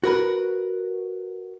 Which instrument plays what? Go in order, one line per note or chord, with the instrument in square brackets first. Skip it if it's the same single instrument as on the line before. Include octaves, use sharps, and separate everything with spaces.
[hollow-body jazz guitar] F#4 A#4 B4